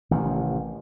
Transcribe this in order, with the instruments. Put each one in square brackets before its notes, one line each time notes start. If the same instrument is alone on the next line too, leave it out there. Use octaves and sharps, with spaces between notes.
[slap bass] A1 C3 D#3 E3